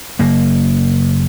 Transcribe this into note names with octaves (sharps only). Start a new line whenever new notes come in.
F#1 A#3